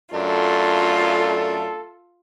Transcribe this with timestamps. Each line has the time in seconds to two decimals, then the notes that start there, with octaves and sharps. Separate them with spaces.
0.14 F#2 A3 D4 F4 A4